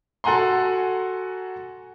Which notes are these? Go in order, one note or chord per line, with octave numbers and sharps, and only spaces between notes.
F#4 A4 F#5 G#5 A#5 C6